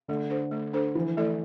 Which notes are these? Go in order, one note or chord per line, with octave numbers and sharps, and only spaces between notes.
D3 A3
D4 A4 C5
A3
D4 A4 C5
E3 F3
A3 E4 A4 D5